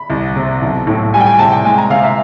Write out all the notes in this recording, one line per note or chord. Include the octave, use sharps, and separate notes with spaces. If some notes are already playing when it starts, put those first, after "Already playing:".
Already playing: B5
C2
C3
B1
A2
G3 G#5
G5
G#5
C3 A5
G5
G#3 G#5
A#5
C3 F5
E5